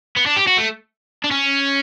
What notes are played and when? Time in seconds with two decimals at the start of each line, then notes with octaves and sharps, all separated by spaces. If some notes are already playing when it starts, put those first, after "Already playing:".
0.17 B3
0.26 D4
0.37 G4
0.48 F#4
0.58 A3
1.24 D4
1.31 C#4